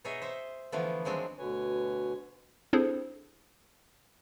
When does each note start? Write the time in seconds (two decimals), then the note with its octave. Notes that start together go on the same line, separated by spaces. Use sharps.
0.05 B2 D#4 G#4 C#5 D#5 E5
0.22 C5 E5
0.72 D3 E3 F3 A3 B3
1.05 D#3 F3 F#3 G#3 C4 D4
1.39 D2 B2 D3 B4 C#5 G#5
2.73 C4 D4 E4 G#4 A4 C5